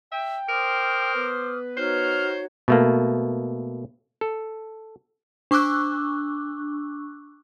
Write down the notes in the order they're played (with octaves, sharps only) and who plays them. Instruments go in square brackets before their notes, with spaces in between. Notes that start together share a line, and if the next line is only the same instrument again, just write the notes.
[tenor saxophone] E5 [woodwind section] G5
[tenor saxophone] A#4 [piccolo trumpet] C5 [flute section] D6 D#6 F6
[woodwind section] B3 B4
[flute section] D#4 F#4 C#5 [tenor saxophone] C5 [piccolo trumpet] F6
[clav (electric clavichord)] B2 A3 A#3
A4
[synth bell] D4 C#6 D6 E6 F#6